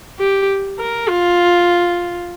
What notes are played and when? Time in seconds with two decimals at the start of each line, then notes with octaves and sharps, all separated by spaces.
0.19 G4
0.79 A#4
1.08 F4